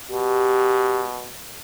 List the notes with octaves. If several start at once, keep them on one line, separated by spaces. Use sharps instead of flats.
B2 G4